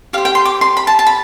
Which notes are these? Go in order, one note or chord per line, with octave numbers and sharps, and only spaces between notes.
G4 C5 F5
G5
C6
D6
C6
B5
A5
A5
B5